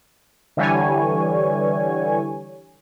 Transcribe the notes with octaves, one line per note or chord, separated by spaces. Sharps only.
D3 E3 G3 C#5 G#5